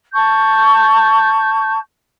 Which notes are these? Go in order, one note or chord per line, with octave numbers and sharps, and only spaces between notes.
A5 C#6 G6